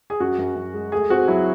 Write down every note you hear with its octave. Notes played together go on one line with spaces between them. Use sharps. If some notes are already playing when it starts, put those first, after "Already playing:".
G#4
F#2 F#4
F#2
F#2
G#3
A3 G#4
C4 F#4
F#3 E4